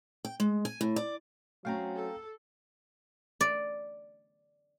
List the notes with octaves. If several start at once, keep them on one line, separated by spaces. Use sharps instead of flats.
G5
G#3
G#5
A2
D5
F#3 A3 C4 C#4 F5 G5 A#5
A4
D5